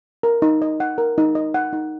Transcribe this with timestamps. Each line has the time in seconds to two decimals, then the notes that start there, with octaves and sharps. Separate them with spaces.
0.23 A#4
0.42 D#4
0.62 D#5
0.80 F#5
0.98 A#4
1.18 D#4
1.35 D#5
1.54 F#5
1.73 D#4